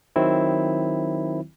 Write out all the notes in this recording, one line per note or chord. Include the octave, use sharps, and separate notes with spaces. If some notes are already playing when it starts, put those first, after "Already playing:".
D#3 F#3 C4 E4